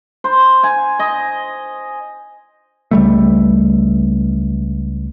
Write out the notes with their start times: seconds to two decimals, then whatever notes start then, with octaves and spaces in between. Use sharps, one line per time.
0.24 C5
0.63 G#5
0.99 D#5
2.91 C#2 G3 A3